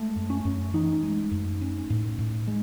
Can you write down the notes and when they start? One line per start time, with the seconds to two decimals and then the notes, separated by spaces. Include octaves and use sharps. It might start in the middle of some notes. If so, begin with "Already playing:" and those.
Already playing: G#3 A3
0.16 F#2
0.30 C#4
0.45 F#2
0.73 E3 D#4
1.03 G#3
1.31 F#2
1.61 C#4
1.90 A2
2.19 A2
2.47 G#3